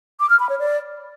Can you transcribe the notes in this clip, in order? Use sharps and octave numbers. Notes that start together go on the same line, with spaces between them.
D6
F6
B5
C#5
D5